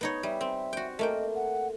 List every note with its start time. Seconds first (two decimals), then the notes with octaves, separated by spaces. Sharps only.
0.01 B3 D#4 C#5
0.23 G3 E5
0.41 C4
0.73 F#4 G5
0.99 A3 A#3 D#5 G5
1.35 F#5